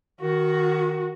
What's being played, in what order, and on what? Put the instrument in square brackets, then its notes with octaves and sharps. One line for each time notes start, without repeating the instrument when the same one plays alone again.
[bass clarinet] D#3 [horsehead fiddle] F#4